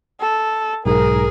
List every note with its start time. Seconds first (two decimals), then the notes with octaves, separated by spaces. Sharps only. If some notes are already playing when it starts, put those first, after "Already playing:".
0.20 A4
0.86 B1 G#2 G#4 A#4